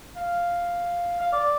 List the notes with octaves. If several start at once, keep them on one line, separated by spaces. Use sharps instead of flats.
F5
F5
D5